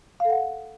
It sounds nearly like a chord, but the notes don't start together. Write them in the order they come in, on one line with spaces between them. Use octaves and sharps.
F5 A4 F#5